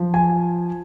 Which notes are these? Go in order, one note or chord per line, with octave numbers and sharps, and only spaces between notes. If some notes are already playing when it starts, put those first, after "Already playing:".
Already playing: F3
G#5